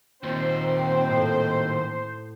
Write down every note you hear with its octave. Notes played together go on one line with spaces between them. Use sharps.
D#2 A#2 C4 C5
A2